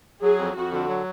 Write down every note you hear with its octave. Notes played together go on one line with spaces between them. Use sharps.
F#3 G#4
F2
F2 F#4
D3
F#3